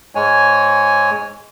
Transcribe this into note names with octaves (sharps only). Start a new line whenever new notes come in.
G#2 G#3 C#5 G#5